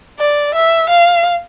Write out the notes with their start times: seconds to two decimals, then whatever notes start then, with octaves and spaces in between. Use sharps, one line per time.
0.19 D5
0.55 E5
0.90 F5